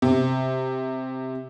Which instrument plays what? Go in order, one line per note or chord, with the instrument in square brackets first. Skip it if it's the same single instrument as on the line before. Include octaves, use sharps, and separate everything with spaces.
[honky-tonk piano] C3